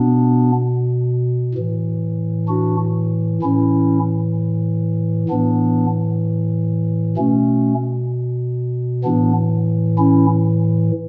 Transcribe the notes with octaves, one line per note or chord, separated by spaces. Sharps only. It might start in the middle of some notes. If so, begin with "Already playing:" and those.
Already playing: B2 B3 D4
A2 E3
D4 F#4
A2 E3 C#4 E4
A2 E3 B3 D4
B2 A3 C#4
A2 E3 B3 D4
C#4 E4